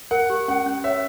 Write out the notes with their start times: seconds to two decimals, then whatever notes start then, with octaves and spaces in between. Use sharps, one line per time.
0.11 A#4 F#5
0.30 G4
0.48 C#4 F#5
0.66 C#4
0.84 C#5 E5